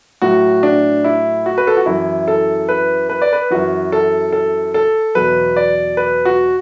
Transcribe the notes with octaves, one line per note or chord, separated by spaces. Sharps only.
A2 F#3 F#4
D4
E4
F#4
B4
A4
F#4
F#2 E3 E4
A4
B4
B4
D5
B4
F#2 E3 F#4
A4
A4
A4
E2 B2 F#3 B4
D5
B4
F#4